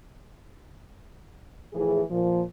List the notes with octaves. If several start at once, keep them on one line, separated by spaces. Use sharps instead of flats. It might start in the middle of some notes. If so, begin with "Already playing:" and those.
A2 E3 F3 G#4
A#2 F3